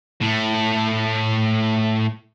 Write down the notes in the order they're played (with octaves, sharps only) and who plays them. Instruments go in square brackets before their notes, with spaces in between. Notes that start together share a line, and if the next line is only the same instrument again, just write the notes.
[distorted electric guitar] A2 A3